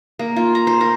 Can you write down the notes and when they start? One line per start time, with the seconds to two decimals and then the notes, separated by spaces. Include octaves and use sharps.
0.19 A#3
0.36 F4
0.55 A#5
0.67 C5
0.81 A#4